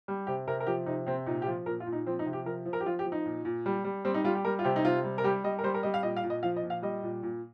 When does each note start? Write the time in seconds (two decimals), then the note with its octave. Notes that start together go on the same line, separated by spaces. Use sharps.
0.08 G3
0.27 C3 G4
0.47 C3 A#4
0.60 A#4
0.67 F3 G4
0.86 C3 D#4
1.06 C3 C4
1.26 A#2 D#4
1.42 G4
1.46 F3 F4
1.66 A#2 A#4
1.80 F4
1.87 A#2
1.93 D#4
2.06 F3 C4
2.19 D#4
2.26 C3
2.33 G4
2.46 F3 A#4
2.66 F3
2.73 A#4
2.80 G4
2.86 F3 F4
2.99 G4
3.05 F3
3.12 D#4
3.26 A#2
3.45 A#2
3.66 G3
3.84 G3
4.05 G3 C4
4.14 D#4
4.24 G3 F4
4.35 G4
4.45 G3 A#4
4.59 F4
4.64 C3 G4
4.76 D#4
4.84 C3 F4
5.04 G3
5.18 A#4
5.24 G3 G4
5.44 G3 D#5
5.59 A#4
5.63 G3 C5
5.74 A#4
5.83 G3 D#5
5.94 F5
6.03 A#2 D#5
6.16 F5
6.23 A#2
6.30 D#5
6.43 F3 F5
6.56 D#5
6.63 A#2
6.70 F5
6.82 G3 D#5
7.03 A#2
7.23 A#2